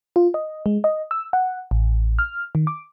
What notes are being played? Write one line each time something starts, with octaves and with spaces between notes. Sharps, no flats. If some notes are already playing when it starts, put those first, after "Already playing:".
F4
D#5
G#3
D#5
E6
F#5
A1
F6
D#3
D6